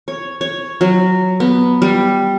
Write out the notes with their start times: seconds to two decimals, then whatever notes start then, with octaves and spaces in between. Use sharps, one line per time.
0.08 C#5
0.41 C#5
0.81 F#3
1.40 B3
1.82 G3